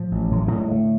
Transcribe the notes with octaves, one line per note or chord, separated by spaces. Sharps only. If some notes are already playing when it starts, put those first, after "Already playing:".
Already playing: A2 F3
A1
A2 F#3
A3
A2 A#3
G3
G#3
D3 A3